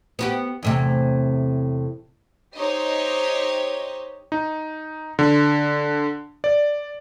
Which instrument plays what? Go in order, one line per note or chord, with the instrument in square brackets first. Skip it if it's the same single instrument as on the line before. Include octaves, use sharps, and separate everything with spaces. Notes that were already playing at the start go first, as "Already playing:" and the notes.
[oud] B3 F#4 G4
E2 A2 C3
[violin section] D#4 G4 C5 C#5 D#5
[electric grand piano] D#4
D3
D5